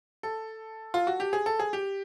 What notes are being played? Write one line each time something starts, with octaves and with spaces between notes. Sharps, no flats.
A4
F4
F#4
G4
G#4
A4
G#4
G4